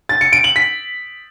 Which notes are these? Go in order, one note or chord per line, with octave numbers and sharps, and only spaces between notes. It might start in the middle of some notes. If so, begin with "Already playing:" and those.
A6
C#7
D7
F#7
B6